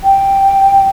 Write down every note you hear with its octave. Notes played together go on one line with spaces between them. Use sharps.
G5